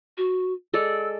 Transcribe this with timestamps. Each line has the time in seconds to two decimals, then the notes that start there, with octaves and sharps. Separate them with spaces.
0.17 F#4
0.73 G#3 A4 D5 E6